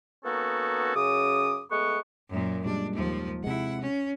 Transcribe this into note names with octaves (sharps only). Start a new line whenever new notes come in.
A#3 B3 C#4 D#4 F#4 A4
F#2 C#3 D6 D#6
G#3 A3 B3 F#5 C#6
F#2 A#2
A#2 G3 G#3 D4
D#2 F3
C3 G#3 E4 F#5
C#4